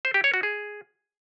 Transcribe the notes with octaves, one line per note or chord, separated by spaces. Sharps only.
C5
G4
C#5
F#4
G#4